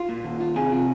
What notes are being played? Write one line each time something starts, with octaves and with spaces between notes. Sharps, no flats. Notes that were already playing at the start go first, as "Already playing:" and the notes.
Already playing: F4
A#2
D#2
F4
C3 G#4
C3 F4